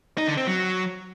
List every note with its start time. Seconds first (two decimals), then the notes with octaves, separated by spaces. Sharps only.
0.18 D#4
0.27 D3
0.37 C4
0.47 F#3